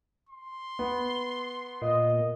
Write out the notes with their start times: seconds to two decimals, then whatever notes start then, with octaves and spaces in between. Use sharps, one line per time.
0.29 C6
0.79 B3
1.82 A#2 D#5